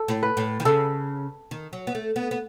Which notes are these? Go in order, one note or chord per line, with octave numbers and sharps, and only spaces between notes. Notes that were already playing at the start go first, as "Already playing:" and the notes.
Already playing: A4
A2
B4
A2
D#3
C#3 A4
D#3
F#3
B3
A3
B3
B3